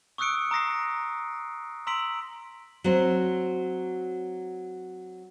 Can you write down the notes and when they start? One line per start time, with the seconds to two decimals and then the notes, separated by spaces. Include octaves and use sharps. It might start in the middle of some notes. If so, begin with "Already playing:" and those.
0.18 C#6 D#6 E6 F#6 C#7 D7
0.51 A#5 D#6 A#6 C7
1.87 A#5 C6 E6 B6 D7 F#7
2.84 F#3 C4